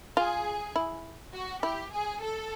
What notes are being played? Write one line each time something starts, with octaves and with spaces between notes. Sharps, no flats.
F4 G#4
E4
F#4
E4 G4
G#4
A4